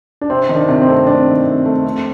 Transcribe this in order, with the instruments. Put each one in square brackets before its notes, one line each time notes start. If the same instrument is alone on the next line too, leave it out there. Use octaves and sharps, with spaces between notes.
[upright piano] D4
[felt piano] C3 [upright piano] C4
[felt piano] D#3
[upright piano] D4
[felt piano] C3
[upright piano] C4
[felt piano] A3
[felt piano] C3 [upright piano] D4
[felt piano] D#3
C3
A3
F2